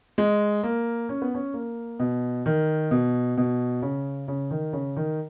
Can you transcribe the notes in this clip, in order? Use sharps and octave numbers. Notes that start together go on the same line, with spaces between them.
G#3
A#3
C#4
B3
C#4
A#3
B2
D#3
B2
B2
C#3
C#3
D#3
C#3
D#3